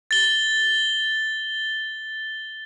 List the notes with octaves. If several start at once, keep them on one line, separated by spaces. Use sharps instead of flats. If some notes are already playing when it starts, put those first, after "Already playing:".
A6 G7